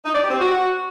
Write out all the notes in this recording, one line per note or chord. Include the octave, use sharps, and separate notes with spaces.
D#4
D5
G4
C4
F#4